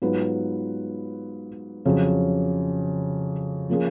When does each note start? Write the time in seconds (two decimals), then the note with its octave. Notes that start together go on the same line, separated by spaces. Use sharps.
0.02 G#2 F#3 B3 F4 B4
1.85 F2 C#3 F#3
3.70 F3 A#3 C#4 G#4